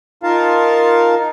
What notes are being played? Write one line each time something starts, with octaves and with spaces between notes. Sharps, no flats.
D#4 F4 A#4 F5 A5
D#4